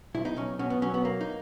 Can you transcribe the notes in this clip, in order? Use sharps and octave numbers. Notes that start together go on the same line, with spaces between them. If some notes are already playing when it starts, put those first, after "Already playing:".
B1 E4
D#4
B1 C#4
B2 C#4
B3
F#3 C#4
B3
A#3
D#4